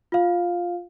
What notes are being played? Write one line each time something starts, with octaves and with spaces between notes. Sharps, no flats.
F4 F5